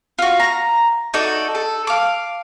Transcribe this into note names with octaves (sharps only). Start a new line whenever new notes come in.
F4 F#4
A#5
D#4 F#4 A4 D5
A4
F5 D6